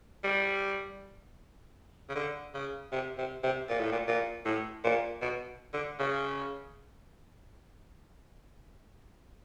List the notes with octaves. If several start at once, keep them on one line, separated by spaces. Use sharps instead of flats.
G3
C#3
D3
C#3
C3
C3
C3
A#2
A2
A#2
A#2
A2
A#2
B2
D3
C#3